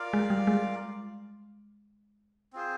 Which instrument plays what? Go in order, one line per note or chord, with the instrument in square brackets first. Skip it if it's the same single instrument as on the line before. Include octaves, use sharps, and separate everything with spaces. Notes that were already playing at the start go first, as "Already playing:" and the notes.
Already playing: [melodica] F4 A#4 D5 F5
[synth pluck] G#3
G3
G#3
[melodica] C4 F4 G#4 C5